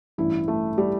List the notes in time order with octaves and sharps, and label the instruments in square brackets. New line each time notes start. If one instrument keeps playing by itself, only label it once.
[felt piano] A1 G2 E3 E4
A3
G3